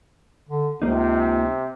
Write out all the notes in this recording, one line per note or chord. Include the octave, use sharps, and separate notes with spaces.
D3
C#2 C3 A#3 D#4